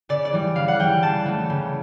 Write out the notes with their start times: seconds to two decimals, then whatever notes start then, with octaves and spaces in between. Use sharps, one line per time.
0.09 C#3 D5
0.25 D5
0.33 E3 G3
0.56 C#3 F5
0.68 F#5
0.80 E3 G3 G5
1.03 C#3 A5
1.26 E3 A3
1.50 C#3